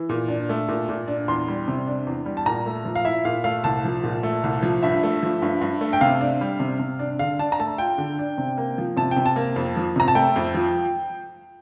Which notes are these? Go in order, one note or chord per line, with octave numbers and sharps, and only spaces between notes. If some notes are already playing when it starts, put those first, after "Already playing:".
Already playing: E3
A#2
D4
A3
A#2
A#2
D4
E2 C6
G3
C3
D4
E2
G3
A5
A#2 A#5
A3
F3
F5
E4 E5
A#2 F5
A3 F5
C2 A5
F3
A#2
A3
C2
F3
G2 E5
A3
F3
G2
G2
A3
G5
C3 F5
D4
G3
C3
C3
D4
D3 F5
D4 A5
A#5
A3 A5
F4 G5
D3
D4
C3
A#3
F3
C3 A5
G5
C3
A5
A#3
F2
F3
C3 A#5
A5
A3 G5
F2
F3